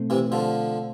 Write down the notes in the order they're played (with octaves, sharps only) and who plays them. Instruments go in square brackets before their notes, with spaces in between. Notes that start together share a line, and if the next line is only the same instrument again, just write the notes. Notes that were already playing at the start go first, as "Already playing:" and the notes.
Already playing: [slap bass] B2 A3 C4
[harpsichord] C3 E3
D3 F3